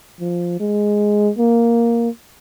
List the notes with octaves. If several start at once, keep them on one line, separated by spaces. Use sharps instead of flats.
F3
G#3
A#3